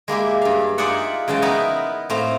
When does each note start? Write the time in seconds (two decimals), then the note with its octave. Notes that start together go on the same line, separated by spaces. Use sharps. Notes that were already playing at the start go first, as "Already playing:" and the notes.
0.08 G#3 A#3 E4 G4
0.42 G2 F5
0.78 D#4 F4 G#4 D5 E5 F#5
1.28 C#3 E3 F#3 G#3 G5 A5
1.42 B3 D#4 E4 A#4 B4
2.10 A2 A3 C4 C5 F5 A#5